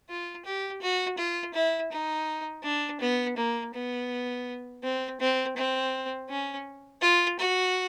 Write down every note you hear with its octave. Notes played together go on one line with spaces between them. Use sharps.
F4
G4
F#4
F4
E4
D#4
D4
B3
A#3
B3
C4
C4
C4
C#4
F4
F#4